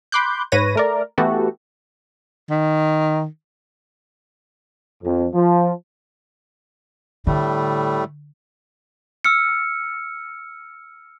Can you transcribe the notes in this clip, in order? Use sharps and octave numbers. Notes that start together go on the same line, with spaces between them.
B5 C6 D6 F#6 G6
G#2 B4 C#5 A#6 D#7
A3 A#4 D5
E3 A3 B3 F#4 G4 A4
D#3
F2
F3
A2 D3 G3 A3
E6 F6 C#7